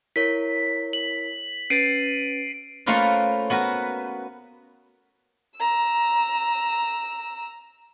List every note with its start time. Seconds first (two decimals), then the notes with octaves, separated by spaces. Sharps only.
0.16 E4 A#4 C#5 B6
0.93 F#7
1.70 C#4 B4 A6 C7 D7 D#7
2.86 A3 A#3 C#4 F4 B4 C5
3.50 B3 F#4 A#4 B4
5.58 A#5 E6